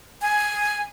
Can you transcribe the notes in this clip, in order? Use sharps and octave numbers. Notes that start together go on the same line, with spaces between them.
G#5